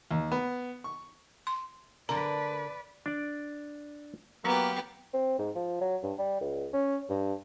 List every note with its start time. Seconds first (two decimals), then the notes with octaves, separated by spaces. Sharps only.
0.11 D#2
0.32 B3
0.84 C#6
1.47 C6
2.09 D3 A#4 B4 D5 A#5
3.06 D4 D5
4.44 F#3 A#3 B3 G4 A#4
5.13 C4
5.39 G#2
5.55 F3
5.81 F#3
6.03 G2
6.18 G3
6.41 C#2
6.73 C#4
7.09 G2